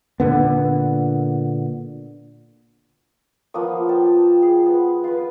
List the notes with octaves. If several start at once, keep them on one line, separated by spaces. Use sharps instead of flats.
A#2 D3 B3
F3 A#3 B3 D#6
G5 A5
G#4
B3
F4 B4